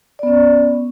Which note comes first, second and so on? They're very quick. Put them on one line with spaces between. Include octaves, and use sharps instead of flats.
D5 B3 C#4